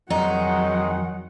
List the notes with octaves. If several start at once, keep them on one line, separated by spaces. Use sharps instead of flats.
F2 D#3 F#3 G#3 D#4 F#5